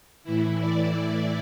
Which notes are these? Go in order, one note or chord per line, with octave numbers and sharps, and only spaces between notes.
A2 E3 E4
D5